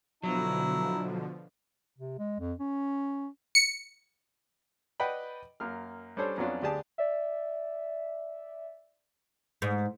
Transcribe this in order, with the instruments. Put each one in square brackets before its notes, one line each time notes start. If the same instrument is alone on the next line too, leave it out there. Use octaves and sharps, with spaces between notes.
[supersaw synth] B2 D3 F3 [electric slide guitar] F#3 [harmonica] E4 A#5
[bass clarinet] C3
G#3
F2
C#4
[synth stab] C#7
[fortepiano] B4 D5 D#5 F#5 G5 B5
F#2 A#3 F6
G3 C#4 D4 A4 C5 C#5
F2 F#3 B3 C#4 D4 F4
D2 D4 G4 G#4 D5 A5
[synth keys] D5 E5
[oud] G#2